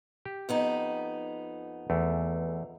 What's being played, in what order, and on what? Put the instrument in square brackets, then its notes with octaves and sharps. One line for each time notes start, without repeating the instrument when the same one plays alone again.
[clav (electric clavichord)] G4
[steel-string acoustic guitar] F2 B3 D#4
[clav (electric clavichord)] E2 A3